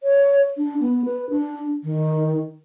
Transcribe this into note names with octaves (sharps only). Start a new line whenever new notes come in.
C#5
D4
B3
B4
D4
D#3